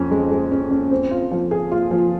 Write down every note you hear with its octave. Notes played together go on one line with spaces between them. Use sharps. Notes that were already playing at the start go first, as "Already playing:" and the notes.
Already playing: F2 C#4
G#3
G#3
C#4
C#4
C4
F4
F3
G#4
F4
F3